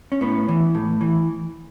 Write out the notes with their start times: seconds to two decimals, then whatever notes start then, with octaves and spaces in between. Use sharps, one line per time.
0.12 C#4
0.21 A2 B3
0.48 E3
0.75 A2
1.01 E3